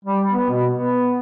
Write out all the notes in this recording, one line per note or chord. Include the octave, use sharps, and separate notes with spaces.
G3
B3
B2
B3